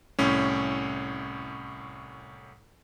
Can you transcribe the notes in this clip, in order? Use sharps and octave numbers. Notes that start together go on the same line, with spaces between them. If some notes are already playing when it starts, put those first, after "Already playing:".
C2 A2 C#4